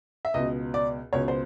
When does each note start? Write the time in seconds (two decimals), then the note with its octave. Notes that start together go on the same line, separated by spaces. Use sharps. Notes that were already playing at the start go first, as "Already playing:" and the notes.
0.25 E5
0.34 C#2 B2 D#5
0.74 D5
1.13 C#2 B2 C#5
1.28 C5